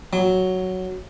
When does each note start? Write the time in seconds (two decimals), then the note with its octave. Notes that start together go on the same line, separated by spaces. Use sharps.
0.13 F#3